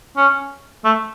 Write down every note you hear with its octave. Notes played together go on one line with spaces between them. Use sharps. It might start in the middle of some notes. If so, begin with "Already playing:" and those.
C#4
A3